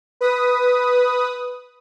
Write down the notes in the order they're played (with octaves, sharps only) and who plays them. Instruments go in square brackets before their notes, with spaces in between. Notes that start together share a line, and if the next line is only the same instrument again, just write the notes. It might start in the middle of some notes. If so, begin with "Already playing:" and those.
[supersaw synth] B4 D#6